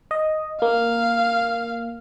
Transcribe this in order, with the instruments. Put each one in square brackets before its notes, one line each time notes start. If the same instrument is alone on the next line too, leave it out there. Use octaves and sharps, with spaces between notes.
[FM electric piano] D#5
[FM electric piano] A#3 [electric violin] F5